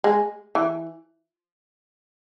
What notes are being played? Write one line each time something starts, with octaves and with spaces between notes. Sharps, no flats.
G#3
E3